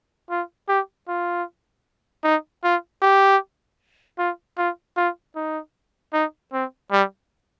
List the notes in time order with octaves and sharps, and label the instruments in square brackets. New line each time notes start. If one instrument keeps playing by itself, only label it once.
[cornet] F4
G4
F4
D#4
F4
G4
F4
F4
F4
D#4
D#4
C4
G3